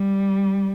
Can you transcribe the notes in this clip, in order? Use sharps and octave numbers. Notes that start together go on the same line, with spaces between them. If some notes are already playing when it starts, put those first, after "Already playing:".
Already playing: G3